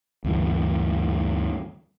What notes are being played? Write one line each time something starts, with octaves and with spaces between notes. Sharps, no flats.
D2 G2 E3